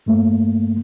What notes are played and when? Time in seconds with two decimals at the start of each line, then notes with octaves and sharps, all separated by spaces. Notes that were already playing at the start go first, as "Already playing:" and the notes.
0.06 G2 A3 A#3